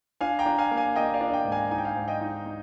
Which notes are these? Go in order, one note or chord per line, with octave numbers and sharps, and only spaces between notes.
D4 F5 G#5
G5 A#5
D4
F5 G#5
A#3
F5 G#5
A#3 D#5 G5
D5 F5
D4
D#5 G5
G#2
F5 G#5
D#4 G#5
G5
F5 G#5
G#2
D#5 G5
D#4
D#4